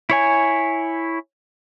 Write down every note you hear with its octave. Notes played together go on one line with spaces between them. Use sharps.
E4 C#5 G#5